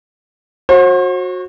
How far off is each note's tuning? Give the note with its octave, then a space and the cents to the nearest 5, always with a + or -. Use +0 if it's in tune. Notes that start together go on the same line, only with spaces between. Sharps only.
F#4 -20 C5 +40